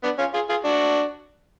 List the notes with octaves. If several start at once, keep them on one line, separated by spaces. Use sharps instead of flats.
B3 D4
C#4 F4
F4 G#4
F4 G#4
D4 F#4